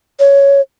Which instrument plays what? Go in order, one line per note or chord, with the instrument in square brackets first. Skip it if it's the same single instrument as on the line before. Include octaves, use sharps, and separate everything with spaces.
[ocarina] C#5